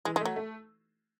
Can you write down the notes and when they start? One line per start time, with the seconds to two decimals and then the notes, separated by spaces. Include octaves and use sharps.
0.05 E3 G#3
0.16 G#3
0.21 F#3 A3
0.36 A3